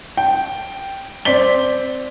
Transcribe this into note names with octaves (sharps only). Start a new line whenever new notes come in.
G5
C4 D5 B6 G7